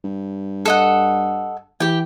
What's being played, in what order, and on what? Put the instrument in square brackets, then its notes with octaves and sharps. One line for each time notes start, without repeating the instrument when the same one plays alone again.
[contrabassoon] G2
[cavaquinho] A4 D#5 F#5
[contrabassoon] E3 [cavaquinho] G4 G5